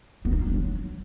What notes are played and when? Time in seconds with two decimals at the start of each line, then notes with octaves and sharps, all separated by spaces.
0.25 B3
0.32 D#4
0.39 F4
0.47 D4
0.54 F#3